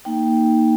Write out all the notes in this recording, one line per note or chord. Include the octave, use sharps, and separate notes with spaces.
A#3 D#4 G5